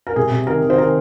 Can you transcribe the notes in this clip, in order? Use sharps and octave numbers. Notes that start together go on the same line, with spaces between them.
A#4
C3 G#4
C3
D#3 A#4
D#3
C5
D#3 A#4